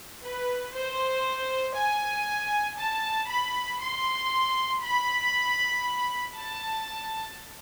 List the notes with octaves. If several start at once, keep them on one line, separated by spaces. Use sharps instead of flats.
B4
C5
G#5
A5
B5
C6
B5
A5